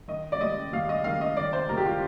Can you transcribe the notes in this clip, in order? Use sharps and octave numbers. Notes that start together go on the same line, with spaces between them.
D#3 D#5
D5
D#2 D#5
D#2 F5
D#5
D#3 F5
D#5
D#3 D5
C5
D#2 A#4
G4
F4